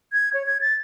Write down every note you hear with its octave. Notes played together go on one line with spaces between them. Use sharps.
G#6
C#5
G#6
A6